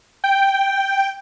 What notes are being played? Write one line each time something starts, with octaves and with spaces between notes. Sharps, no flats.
G5